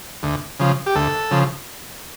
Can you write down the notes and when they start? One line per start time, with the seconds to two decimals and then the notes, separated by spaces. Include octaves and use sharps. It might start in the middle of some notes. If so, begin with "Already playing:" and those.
0.23 D2
0.59 C#3 F3
0.86 G4
0.95 D2 A4
1.31 C#3 F3